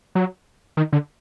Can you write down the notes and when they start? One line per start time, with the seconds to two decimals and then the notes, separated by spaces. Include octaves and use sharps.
0.15 F#3
0.77 D#3
0.93 D3